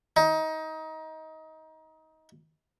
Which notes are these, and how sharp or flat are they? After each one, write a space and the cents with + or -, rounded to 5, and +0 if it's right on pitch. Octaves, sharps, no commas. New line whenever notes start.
D#4 +25